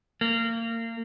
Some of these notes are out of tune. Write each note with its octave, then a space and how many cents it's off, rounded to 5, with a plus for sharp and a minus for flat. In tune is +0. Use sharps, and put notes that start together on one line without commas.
A#3 -30